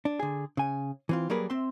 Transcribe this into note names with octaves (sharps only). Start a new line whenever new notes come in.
D4
D3 G#4
C#3 G#5
E3 C4 F4
F#3 G3 A#3 G#4 A#4 B4
C4 E5 C6